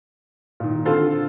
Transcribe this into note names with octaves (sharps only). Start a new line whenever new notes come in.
A#2 D#3
D3 C4 F4 A4 C5